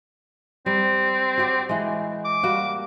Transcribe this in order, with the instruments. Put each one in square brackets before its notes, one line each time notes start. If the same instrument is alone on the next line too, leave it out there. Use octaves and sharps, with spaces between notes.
[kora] G3 [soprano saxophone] C4
[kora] F#4 G4 C#5
E3 G#3
[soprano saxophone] D6
[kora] G3 A#3 F#4